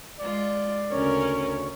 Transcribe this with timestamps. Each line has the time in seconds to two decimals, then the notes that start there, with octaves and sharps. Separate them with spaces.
0.20 G#3 F4 D5
0.91 D2 C#3 C#4 A#4 C#5